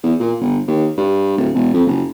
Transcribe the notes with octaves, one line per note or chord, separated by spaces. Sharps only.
E2
A#2
G1
D#2
G2
D1
E1
F2
F#1